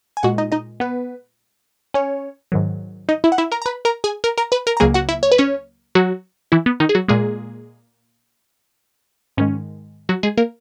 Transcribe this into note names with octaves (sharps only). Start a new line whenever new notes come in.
G#5
A#2 G#3 F#4 F#5
D#4 D#5
D#4 D#5
B3 B4
C#4 C#5
G#2 D#3 F#3
D#4 D#5
E4 E5
F#5
E4 E5
A#4 A#5
A#5
B4 B5
A#4 A#5
G#4 G#5
A#4 A#5
A#4 A#5
B4 B5
A#4 A#5
A#5
C#2 C#3 F#3 A#3 G#4 G#5
F#4 F#5
E4 E5
C#5
B4
C#4 C#5
F#3 F#4
E3 E4
B3
D#3 D#4
G#4
F#3 F#4
A#2 G#3 A#3 G#4
G#2 D#3 G#3 C#4
F#3 F#4
G#3 G#4
A#3 A#4